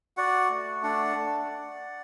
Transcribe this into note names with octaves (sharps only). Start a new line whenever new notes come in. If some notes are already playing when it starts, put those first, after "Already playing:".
F#4 D5 F#5
A3
D4 D5 F#5
A3